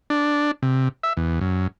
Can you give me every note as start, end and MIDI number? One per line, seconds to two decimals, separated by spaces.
0.10 0.51 62
0.63 0.88 48
1.03 1.13 76
1.17 1.39 40
1.41 1.67 42